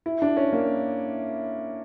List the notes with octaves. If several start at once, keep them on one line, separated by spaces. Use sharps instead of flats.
E4
D4
C#4
A#3